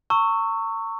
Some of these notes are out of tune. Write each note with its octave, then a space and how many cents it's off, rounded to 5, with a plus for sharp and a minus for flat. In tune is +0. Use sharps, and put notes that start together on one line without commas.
A#5 -40 C#6 +0 E6 +0